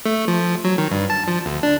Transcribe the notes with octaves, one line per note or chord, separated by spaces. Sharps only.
A3
F3
F#3
D#3
G2
A5
F3
D2
D4